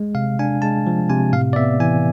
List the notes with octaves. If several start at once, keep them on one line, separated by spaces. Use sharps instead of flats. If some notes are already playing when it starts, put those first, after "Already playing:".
Already playing: G#3
C3 F5
D4 G#5
G#3 A5
F3
C3 G#5
A2 F5
D5
B3 E5
E3 G#5